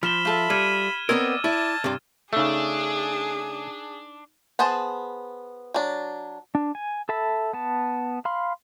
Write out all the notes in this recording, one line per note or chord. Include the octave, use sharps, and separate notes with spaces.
F3 C5 B5 F6 E7 G7
F4 A4 E5
G3 F6 G#6 D#7
B3 C4 A#4 D5 D#5 E6 G#6 G7
E4 D5 A5
G2 C3 D5 D6
C#3 A3 D4 D#4 G#4 E6
B3 G#4 C5 A5
F#3 D4
D4
G#5
A4 E5 A5 B5
B3 A5
F5 B5 C6